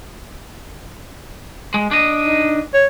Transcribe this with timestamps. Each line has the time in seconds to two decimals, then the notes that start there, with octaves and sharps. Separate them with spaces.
1.74 G#3
1.91 D4 D#5
2.25 D#4
2.74 C#5